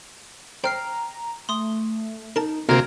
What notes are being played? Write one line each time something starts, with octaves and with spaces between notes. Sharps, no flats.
C5 G5 A#5 F6 C7
A3 C6 D#6
D#4 A#4 A5
D2 C3 A#3 A#5 F6 G#6 D7